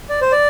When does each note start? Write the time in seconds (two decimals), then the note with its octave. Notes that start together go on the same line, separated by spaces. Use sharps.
0.09 D5
0.21 C5
0.32 D5